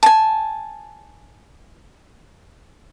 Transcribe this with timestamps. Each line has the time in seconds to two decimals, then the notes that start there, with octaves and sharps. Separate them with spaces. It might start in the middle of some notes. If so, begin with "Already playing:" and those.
0.03 G#5 A5